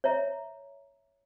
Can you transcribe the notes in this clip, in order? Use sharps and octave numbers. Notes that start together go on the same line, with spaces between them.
C#5 E5 A#5